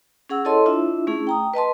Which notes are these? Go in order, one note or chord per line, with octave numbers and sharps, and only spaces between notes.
C#4 G#4 F#5 E6
E4 A4 C#5 D#5 A5 C6
D4 E4 F4 E5
A3 C#4 E4 G#4
G5 A#5 D#6
B4 D#5 A5 C6